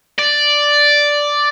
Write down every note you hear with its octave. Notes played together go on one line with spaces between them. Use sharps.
D5